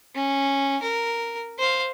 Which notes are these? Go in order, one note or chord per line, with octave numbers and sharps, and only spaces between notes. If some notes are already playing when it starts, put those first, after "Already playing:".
C#4
A#4
C5 F5